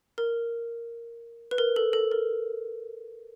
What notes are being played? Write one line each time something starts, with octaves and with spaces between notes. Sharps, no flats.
A#4
B4
A#4
A4
A4
A#4